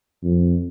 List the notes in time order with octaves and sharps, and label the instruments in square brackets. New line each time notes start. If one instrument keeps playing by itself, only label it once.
[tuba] F2